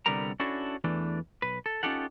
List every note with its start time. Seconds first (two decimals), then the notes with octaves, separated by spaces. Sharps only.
0.06 C2 D3 G3 B3 A#4 A#5
0.40 C#4 D4 E4 F#4 A4
0.84 E2 E3 A3 D4
1.42 B1 B4
1.66 A4
1.83 C#4 D#4 F4 G4 A4 F#5